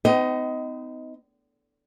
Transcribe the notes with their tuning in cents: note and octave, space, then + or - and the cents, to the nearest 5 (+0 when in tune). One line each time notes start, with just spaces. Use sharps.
C4 -45 D#4 +15 D#5 +10